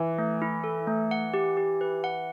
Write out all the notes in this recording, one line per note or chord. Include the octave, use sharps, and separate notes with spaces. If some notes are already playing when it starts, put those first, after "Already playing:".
Already playing: E3
A3
E4
A4
A3
F#5
G4
G4
B4
F#5